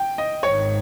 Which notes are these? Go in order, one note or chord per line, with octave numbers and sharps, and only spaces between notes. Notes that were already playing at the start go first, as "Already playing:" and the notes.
Already playing: G5
D#5
G#1 G#2 D#3 C#5